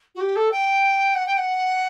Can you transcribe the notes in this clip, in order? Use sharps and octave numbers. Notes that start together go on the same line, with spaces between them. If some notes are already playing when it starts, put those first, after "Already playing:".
F#4
G4
A4
G5
F#5
G5
F#5